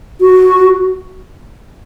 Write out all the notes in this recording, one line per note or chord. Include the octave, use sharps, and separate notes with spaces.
F#4